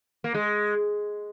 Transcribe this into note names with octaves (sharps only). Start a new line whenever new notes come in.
A#3
G#3